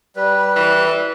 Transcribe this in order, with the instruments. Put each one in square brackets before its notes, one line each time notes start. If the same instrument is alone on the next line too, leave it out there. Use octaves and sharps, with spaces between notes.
[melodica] G3 B4
[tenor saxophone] E3